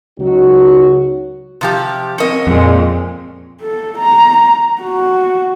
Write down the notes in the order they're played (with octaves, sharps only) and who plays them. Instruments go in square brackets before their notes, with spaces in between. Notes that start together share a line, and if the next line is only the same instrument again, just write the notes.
[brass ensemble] C#2 F#3 D#4 F#4
[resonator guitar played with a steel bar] C3 F3 G4
[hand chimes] C4 A#4 C#7 [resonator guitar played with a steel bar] C#4 D#5
[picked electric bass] F2 [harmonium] A#2 G#3
[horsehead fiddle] A4
A#5
F#4